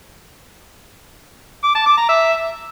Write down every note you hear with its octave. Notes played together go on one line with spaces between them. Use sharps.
D6
A5
D6
A#5
E5